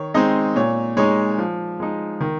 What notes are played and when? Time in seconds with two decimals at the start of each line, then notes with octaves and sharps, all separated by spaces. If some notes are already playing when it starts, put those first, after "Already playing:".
Already playing: D#3 C#5
0.14 G#3 C4 D#4 D#5
0.56 A#2 C#5
0.97 G#3 D#4 C#5
1.38 F3
1.80 G#3 D#4
2.20 D#3